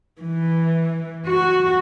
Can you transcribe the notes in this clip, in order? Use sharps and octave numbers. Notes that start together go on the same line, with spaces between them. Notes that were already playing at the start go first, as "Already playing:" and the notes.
E3
F#4